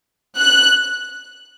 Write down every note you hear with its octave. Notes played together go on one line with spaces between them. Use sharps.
F#6